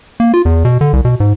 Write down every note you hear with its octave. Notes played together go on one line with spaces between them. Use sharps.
A#3
F4
E2
B2
D3
C2
B2
G#2